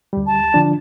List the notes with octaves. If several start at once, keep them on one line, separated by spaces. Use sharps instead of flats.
D2 G3
A5
D3 F3 D4